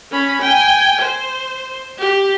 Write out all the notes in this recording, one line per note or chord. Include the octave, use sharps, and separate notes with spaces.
C#4 B5
G5 G#5
C5
G4